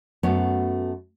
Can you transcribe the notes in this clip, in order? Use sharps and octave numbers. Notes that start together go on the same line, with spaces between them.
F#2 A3 B3 F#4 C#5